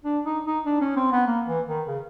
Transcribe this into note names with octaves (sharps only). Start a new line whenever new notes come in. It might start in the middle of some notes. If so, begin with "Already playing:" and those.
D4
D#4
D#4
D4
C#4
C4
B3
A#3
E3
D#3
C#3